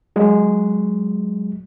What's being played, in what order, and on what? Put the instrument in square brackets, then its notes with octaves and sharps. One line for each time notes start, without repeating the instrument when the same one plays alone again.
[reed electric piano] F#3 G#3